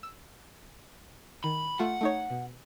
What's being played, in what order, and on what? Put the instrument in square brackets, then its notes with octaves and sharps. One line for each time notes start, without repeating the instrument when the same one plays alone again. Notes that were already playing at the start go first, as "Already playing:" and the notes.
[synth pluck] E6
[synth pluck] D#3 [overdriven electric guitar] B5
[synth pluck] A3 F4 [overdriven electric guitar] F#5
[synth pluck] A3 D#4 C#5
B2